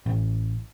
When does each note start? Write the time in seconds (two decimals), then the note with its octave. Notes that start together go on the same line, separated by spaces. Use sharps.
0.06 A1